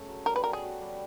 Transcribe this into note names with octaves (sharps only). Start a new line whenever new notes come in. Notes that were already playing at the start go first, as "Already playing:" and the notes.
Already playing: C#3 A3
F#3
G3 A#4
B4
B3 A#4
G#4
F#4
G3